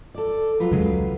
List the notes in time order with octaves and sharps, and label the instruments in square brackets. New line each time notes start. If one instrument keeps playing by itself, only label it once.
[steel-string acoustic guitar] A4 D5
F#3 F4 B4
[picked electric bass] E2 C#3 G#3
C#2